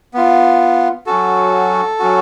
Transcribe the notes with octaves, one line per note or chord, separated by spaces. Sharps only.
B3 F4
F#3 C#4 F#4 A4
F#3 C#4 F#4